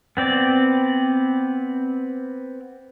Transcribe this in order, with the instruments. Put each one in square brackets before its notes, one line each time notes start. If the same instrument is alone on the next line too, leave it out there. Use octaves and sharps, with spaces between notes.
[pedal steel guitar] B3 C4 D5